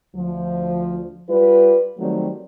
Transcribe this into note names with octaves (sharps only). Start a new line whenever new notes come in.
D2 F3
G3 F4 B4
D#3 F#3 G3 A3 C4